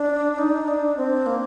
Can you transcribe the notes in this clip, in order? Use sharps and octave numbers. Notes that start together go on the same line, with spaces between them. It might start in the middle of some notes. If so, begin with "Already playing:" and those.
Already playing: D4
D4
D#4
D4
C4
A#3